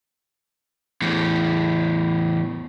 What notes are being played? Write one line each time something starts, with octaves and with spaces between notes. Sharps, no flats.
E2 A2